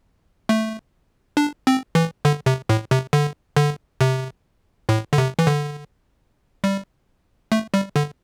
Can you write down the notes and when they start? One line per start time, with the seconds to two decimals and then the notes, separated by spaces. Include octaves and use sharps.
0.49 A3
1.37 D4
1.67 C4
1.95 E3
2.25 D3
2.46 C3
2.69 A2
2.91 C3
3.13 D3
3.57 D3
4.01 C3
4.89 A2
5.13 D3
5.18 C3
5.39 E3
5.47 D3
6.64 G3
7.52 A3
7.74 G3
7.96 D3